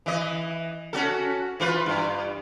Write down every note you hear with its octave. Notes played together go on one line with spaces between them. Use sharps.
E3 D#5
C#4 F#4 A4
E3 F4 B4
G2